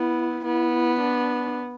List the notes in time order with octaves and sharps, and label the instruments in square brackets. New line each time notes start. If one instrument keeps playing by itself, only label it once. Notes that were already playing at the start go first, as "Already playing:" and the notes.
Already playing: [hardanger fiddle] B3 [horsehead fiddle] E4
[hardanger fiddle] B3 [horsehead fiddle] E4
[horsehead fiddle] D4